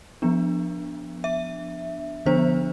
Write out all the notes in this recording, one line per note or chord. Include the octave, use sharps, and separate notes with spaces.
F3 B3 D4
E5
D3 F3 B3 D4 C5